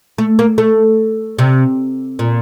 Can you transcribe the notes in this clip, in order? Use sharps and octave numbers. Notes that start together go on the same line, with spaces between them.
A3
A#3
A3
C3
A#2